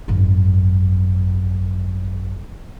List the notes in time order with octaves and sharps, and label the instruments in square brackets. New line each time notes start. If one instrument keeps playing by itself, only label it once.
[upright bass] G#1 F#2